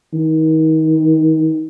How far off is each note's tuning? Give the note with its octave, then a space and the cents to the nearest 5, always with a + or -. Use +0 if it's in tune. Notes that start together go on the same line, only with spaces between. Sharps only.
D#3 +30